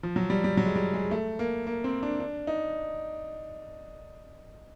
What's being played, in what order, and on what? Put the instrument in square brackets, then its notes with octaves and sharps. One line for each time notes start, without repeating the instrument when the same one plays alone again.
[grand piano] F3
F#3
G3
G3
F#3
G#3
G3
G#3
A3
A#3
A#3
C4
D4
D4
D#4